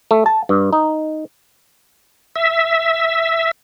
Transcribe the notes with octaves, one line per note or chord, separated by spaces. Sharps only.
A3
A5
G2
D#4
E5